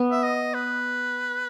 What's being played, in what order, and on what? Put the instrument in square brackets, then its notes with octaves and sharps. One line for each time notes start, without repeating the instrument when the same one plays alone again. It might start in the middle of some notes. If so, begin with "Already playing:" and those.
Already playing: [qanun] B3
[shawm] E5
D#5
B4